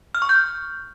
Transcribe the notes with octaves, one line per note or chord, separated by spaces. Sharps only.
F6
C#6
G6